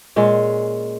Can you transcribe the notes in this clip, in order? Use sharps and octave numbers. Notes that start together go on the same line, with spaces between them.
A#2 G#3 C#4